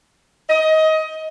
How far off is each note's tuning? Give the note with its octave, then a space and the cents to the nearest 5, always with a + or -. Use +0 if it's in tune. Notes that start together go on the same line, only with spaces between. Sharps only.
D#5 +20